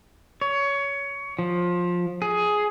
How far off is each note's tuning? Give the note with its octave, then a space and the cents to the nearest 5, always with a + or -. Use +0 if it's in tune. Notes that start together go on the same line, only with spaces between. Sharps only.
C#5 +20
F3 +15
G#4 +10